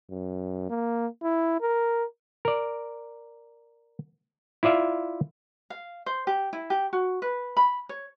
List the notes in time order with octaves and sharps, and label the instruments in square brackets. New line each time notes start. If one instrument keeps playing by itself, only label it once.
[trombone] F#2
A#3
E4
A#4
[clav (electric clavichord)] A#4 D5
E4 F4 D5 E5 F5
[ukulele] F5
C5
G4
E4
G4
F#4
B4
B5
C#5